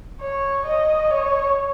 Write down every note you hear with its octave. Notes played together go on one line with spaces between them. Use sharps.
C#5
D#5
C#5